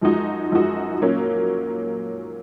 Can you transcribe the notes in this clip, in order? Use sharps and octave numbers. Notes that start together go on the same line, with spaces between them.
F#2 F3 G#3 D#4 F#4
F#2 F3 G#3 D#4 F#4
A#2 F#3 A#3 C#4